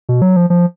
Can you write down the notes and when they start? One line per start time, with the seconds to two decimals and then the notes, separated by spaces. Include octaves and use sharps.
0.09 B2
0.22 F#3
0.36 F3
0.50 F3